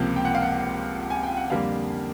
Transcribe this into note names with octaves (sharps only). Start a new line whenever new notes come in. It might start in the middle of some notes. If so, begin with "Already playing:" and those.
Already playing: C#2 C3 F3 A#3
G5
F#5
F5
F#5
G#5
G5
F#5
F2 D3 G3 A#3 F5